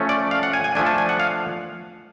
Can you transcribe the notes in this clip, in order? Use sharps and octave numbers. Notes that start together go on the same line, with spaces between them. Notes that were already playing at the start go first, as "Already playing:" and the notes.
Already playing: F3 A3 C#4
D5
F5
F#5
G#5
G#5
F3 A3 D4 G#5
A5
G#5
F#5
F5